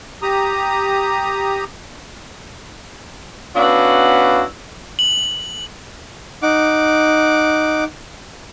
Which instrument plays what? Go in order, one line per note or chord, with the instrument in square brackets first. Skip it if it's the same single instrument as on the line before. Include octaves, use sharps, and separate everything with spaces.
[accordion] G4 A#5 D#6
[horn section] B3 C#4 D4 E4 F#4 F5
[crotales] F#7
[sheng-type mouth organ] D#4 F#5 D6